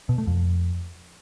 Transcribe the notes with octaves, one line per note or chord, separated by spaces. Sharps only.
B2
A3
F2